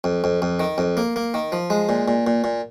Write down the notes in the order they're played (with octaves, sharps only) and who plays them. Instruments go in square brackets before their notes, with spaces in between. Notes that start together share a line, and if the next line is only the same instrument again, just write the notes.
[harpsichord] F2
F2
F2
D#3
F2
A#3
A#3
D#3
F3
G#3
A#2
A#2
A#2
A#2